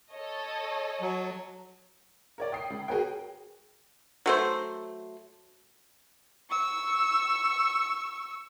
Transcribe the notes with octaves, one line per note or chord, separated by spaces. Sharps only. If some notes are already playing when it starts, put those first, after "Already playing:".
A4 C#5 D#5
F#3
A#4 C#5 D5
G5 D#6 C7
C#2
F#4 G#4 A#4 B4 C#5 G5
F#3 A3 C5
C#6 E6